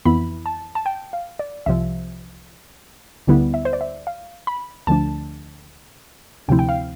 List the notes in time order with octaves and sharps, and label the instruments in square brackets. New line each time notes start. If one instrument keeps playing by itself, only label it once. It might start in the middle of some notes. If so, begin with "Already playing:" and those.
[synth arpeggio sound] F2 E3 B3 E4 B5
A5
A5
G5
F5
D5
C2 C3 F3 E5
D2 D3 G3 B3 E4
E5
C5
D5
E5
F5
B5
D2 D3 F3 A3 D4 A5
D2 C3 F3 C4 E4 G5
G5
F5